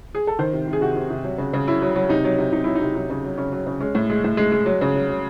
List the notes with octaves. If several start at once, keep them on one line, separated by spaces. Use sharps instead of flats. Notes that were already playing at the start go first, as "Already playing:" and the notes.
G#4
A4
D#3 C5
C3
C3
G#4
C3 F#4
C3
C3
F#3
C#3
C#3
F#3 E4
F#3
F#3
C3 D#4
F#3
C3
C3 D#4
F#3 E4
D#4
C3
F#3 D#4
C#3
F#3
C#3 C#4
F#3
C#3
G#3 C#4
A2
G#3
A2
G#3
G#3
F#3
C#3
F#3
F#3